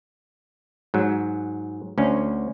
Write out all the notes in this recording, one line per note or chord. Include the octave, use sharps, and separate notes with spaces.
G#2 F#3
D2 C#4